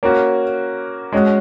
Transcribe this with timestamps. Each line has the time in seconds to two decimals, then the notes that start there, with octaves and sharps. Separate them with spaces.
0.03 A#3 C#4 F#4
1.12 G#3 C#4 F#4